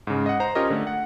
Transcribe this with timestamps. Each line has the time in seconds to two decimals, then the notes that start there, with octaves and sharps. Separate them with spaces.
0.07 G#2 C#3
0.26 D#5 F#5
0.40 C5 A#5
0.55 C#4 F4 G4 A#4 C#5 D#5
0.70 D3 A3
0.87 F#5